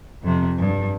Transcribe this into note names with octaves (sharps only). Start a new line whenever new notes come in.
F2 C3
G2